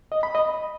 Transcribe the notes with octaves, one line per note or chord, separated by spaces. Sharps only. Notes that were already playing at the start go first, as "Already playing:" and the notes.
D#5
B5
D#5